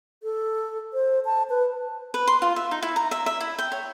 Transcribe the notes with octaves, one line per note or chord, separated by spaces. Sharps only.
A4
C5
A5
B4
B4
C6
F4
E5
D#4
E4
A#5
E5
E5
E4
G5
C#5